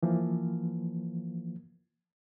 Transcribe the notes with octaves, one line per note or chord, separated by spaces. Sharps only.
E3 F3 A#3